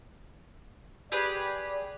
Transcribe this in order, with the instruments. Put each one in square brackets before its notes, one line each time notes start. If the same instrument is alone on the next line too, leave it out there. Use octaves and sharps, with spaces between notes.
[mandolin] G4 G#4 B4 [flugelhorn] D5